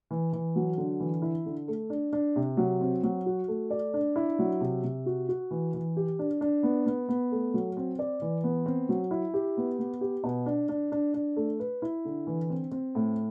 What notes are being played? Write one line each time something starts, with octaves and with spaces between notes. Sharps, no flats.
E3
E3
F#3
D3
E3
E4
D3
A3
D4
D4
C3
F#3
C4
F#3
F#4
A3
D5
D4
E4
F#3
C3
C3
F#4
F#4
E3
E3
G4
D4
D4
B3
B3
B3
A3
F#3
C4
D5
E3
B3
C4
F#3
E4
G4
B3
B3
G4
B2
D4
D4
D4
D4
A3
B4
E4
D3
E3
C4
C4
A2